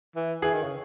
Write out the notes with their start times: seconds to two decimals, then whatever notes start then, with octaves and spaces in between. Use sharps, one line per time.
0.16 E3
0.42 E3 G#4
0.53 D#3
0.63 C#3